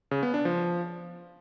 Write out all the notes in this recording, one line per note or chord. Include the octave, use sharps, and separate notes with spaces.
C#3
B3
D4
F3